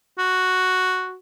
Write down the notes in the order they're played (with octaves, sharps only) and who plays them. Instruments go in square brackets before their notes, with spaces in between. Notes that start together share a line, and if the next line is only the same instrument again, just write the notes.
[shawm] F#4